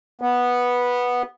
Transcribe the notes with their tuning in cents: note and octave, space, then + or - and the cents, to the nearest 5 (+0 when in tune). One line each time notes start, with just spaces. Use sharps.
B3 -10